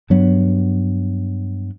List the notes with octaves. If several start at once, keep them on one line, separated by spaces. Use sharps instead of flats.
G2 F#3 B3